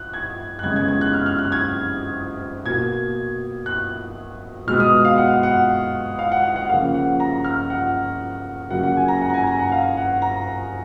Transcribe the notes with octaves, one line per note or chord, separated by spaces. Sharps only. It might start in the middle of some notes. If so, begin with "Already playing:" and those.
Already playing: F#6
G#6
F#6
C#3 G#3 B3 G#6
G#6
G#6
F#6
F6
F6
F#6
G#6
B2 A#3 G#6
F#6
B2 G#3 B3 F6
D#6
F5
F#5
F#5
F5
F#5
F#5
F#5
C#3 F3 A#3 F5
F#5
A#5
F6
F#5
C#3 F#3 A#3 F#5
F#5
G#5
A#5
F#5
A#5
G#5
A#5
F#5
F5
F#5
A#5